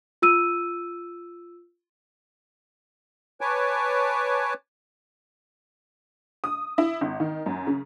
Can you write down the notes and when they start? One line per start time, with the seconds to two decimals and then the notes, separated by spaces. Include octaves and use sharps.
0.22 F4 E6 D#7
3.41 B4 C#5 G#5 A5 D6
6.44 D#6
6.78 E4
7.01 G#1
7.20 D#3
7.46 F#2
7.67 C#3